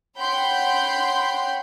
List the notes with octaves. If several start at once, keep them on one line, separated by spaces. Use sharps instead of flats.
C#5 F#5 G5 B5 C6 G6